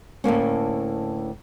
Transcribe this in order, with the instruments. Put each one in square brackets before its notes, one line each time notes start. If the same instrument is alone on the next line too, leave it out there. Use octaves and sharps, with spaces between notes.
[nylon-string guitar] D2 A2 A#3 C#4